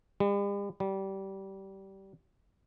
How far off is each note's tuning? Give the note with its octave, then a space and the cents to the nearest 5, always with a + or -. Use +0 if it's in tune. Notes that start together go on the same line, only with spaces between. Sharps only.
G3 +45
G3 -20